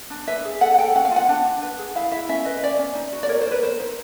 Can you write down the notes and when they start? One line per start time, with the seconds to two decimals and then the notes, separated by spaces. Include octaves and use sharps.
0.10 D4
0.28 B4 E5
0.45 G#4
0.61 A4 F#5
0.74 F#5
0.78 A4 G5
0.95 C#4 F#5
1.05 F5
1.11 F4
1.16 F#5
1.29 D4
1.45 D4
1.62 B4
1.79 G#4
1.95 E4 F5
2.12 E4 E5
2.29 C#4 E5
2.45 B4 D#5
2.63 C#4 D5
2.79 C#4
2.95 D#4
3.13 F#4
3.23 D5
3.29 A#4 C#5
3.41 C5
3.46 A#4 B4
3.63 A#4 C5
3.80 D#4